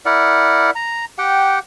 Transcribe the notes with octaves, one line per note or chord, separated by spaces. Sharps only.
E4 A#4 D5 F#5
A#5
G4 F#5 G5